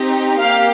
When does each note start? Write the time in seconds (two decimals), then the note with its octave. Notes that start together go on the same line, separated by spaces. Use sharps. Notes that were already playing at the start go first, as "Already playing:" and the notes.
Already playing: C4 D#4 G4
0.39 A#3 G4 F5